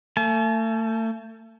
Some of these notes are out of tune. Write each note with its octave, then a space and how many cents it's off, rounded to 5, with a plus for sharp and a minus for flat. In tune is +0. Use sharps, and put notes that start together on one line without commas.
A3 +35 A5 -40